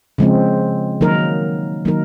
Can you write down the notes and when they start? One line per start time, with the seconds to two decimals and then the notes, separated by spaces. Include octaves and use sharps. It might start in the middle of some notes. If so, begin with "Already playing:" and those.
0.18 C#3 F3 G#3 C4
1.01 D#3 F#3 A#3 D#4 A#4
1.85 D#3 F#3 A#3 D#4 A#4